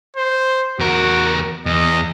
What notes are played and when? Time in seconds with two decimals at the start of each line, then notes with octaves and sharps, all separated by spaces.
0.16 C5
0.79 E2 F#4 A#4
1.66 E2 D#5